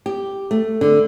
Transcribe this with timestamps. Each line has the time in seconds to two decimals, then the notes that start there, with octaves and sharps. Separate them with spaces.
0.06 G4
0.51 A3
0.81 D3